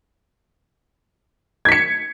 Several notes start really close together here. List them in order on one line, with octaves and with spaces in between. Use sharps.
G#6 B6 C#7